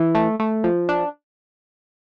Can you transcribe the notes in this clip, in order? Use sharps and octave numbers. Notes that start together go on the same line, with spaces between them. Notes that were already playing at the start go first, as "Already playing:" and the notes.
Already playing: E3
A3
A3
F3
D4